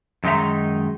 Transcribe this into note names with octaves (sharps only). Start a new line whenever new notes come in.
F#2 D#3 G#3 D#4 E5 A#5